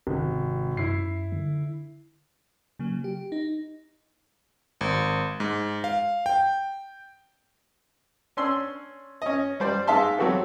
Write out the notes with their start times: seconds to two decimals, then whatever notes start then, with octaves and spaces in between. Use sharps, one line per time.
0.07 G#1 C3
0.77 F#2 E4 C7
1.32 D3
2.79 C#3 F#3 A#3
3.04 G4
3.32 D#4
4.81 G#1
5.40 G#2
5.84 F5
6.26 G5
8.37 C#4 D4 C6 E6
9.22 C#4 D#5
9.60 G3 C5 D5
9.87 G#2 G#3 E5 F5 A5 C6
10.18 F#3 B3 C4 F#4 G4 A4